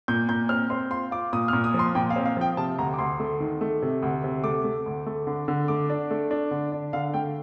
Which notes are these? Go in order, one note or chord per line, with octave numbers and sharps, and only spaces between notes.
A#2 G6
A#2 G6
C4 F6
C4 C6
F4 C6
F4 D6
A#2 D#6
F6
A#2
D#6
F3 C6
A#2 G5
F5
C4
F5
F3 G5
C3 A5
D2 A#5
D6
D2 C6
A3
D#3
A3
C3
D2
C3
A3 D6
A3
D2
A3
D3
D3
A3 D6
D4
A3
D4
D3
D4
D3 F5
A3 G5